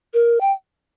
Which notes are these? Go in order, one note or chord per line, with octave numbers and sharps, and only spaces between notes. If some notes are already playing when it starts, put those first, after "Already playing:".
A#4
G5